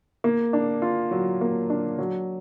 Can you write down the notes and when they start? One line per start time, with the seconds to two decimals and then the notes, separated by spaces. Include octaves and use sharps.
0.24 A#3
0.53 D4
0.82 F4
1.11 F#3
1.41 A#3
1.70 D4
1.98 F#3